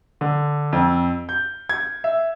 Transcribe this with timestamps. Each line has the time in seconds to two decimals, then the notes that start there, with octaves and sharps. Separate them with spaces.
0.21 D3
0.73 F2
1.29 G6
1.69 G#6
2.04 E5